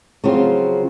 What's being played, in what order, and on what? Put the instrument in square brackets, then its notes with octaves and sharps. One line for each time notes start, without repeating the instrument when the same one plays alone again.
[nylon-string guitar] C#3 F3 F#3 C4 F4